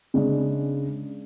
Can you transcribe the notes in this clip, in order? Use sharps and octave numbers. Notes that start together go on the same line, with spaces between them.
C#3 G#3 D4